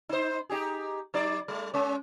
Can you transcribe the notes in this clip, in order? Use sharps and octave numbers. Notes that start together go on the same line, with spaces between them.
D#4 C5
D#4 G4 G#4
F#3 D#4 D5
G3 A3
G#3 C#4